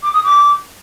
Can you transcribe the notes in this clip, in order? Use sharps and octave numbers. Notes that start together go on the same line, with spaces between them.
D6
D#6
D6